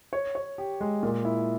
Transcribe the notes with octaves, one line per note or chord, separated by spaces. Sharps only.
C#5
C#5
G4
G#3
A#2
E4